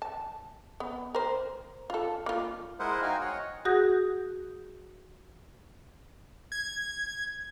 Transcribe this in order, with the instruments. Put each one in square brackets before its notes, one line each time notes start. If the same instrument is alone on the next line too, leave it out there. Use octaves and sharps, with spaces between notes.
[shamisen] A5
B3
A#4 C5
F4 A4
A#3 F4
[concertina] G#3 E4 A#4 C5 D#5 F#5
D#4 F#4 F5 G5 G#5
C#5 D#5 F#5
[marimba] F#4 G#4 F#5 D#6 G6 A#6
[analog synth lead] G#6